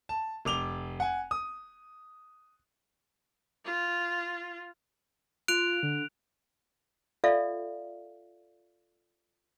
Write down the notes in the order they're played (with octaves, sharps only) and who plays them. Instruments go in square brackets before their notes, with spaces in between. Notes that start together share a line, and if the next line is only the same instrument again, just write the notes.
[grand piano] A5
F1 D6 F7 G7
F#5 G#5
D#6
[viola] F4
[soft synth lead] F4 [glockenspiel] F#6 D7 F7
[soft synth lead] D3
[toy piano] F4 A4 D5 E5 F5